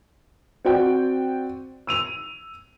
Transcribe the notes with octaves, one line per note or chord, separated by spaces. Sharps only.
C4 F#4 D5 G5
E6 D#7 F7